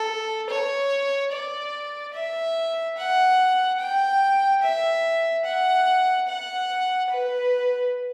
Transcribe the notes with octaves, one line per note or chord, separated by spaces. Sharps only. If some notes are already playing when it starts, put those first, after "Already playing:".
Already playing: A4
C#5
D5
E5
F#5
G5
E5
F#5
F#5
B4